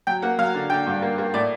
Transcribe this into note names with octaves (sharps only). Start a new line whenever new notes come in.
F#3 G5
A#3 F#5
F#3 F5
D3
D3 G5
G2
A#3
A#3
A2 D5